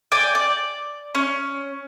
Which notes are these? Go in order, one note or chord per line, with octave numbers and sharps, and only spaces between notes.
D5 G5 G#5 D6
D5
C#4